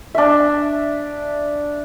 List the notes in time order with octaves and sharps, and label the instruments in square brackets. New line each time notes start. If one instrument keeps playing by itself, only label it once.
[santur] D4 E5